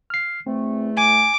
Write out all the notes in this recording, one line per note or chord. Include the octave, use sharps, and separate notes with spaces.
F6 C7
E2 A3 C4
G#5 D6